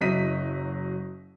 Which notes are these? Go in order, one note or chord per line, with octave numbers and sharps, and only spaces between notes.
F#1 F#3 E4 D#5 B6 D#7